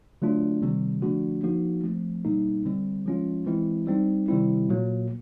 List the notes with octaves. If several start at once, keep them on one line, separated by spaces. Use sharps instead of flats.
D3 F#3 A3 D4 F4
C3 D#3 G3 C4
D3 F3 A3 D4 F#4
F3 A#3 D#4 F#4
F3 A3 C4
B2 G3 A#3 D#4
D3 G3 C4
F3 G#3 C#4 F4
E3 G#3 C4 E4
G3 C4 D#4
C3 D#3 G3 C4 E4
A#2 F#3 A#3